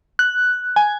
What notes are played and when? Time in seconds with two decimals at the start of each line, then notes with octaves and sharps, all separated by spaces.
0.19 F#6
0.76 G#5